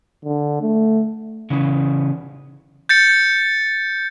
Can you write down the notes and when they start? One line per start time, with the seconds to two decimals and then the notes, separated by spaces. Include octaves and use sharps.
0.25 D3
0.61 A3
1.50 C#3 E3
2.89 G6 A6 C#7